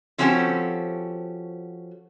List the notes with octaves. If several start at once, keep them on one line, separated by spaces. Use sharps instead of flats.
F3 C4 C#4 F#4 G4 A4